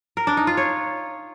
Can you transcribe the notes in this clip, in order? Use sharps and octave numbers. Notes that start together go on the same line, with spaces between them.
A#4
D4
D#4
F4
C#5